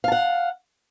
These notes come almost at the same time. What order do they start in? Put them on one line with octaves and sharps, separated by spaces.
F5 A5 F#5